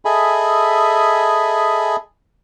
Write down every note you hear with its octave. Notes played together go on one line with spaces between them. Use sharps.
G#4 A4 D#5 E5 G#5 B5